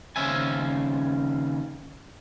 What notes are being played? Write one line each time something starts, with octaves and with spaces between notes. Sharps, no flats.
D#2 C#3 C#4 C5 E5 G#5